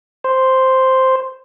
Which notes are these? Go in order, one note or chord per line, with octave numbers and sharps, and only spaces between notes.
C5